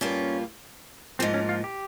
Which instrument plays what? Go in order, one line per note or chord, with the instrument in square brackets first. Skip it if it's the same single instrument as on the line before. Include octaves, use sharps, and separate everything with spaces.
[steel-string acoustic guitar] G2 G3 A#3 F4 [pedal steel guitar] C#4
[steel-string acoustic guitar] G#2 F3 A#3 [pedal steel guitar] C4
[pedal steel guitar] C#4
F4
G4